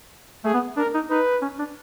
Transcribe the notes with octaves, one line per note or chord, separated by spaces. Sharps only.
A3 G#4
B3
D4 A#4
D#4
D#4 B4
C#4
D4